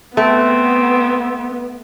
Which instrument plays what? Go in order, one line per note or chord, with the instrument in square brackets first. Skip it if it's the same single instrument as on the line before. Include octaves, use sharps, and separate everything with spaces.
[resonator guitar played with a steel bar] A3 [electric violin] B3 [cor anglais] C4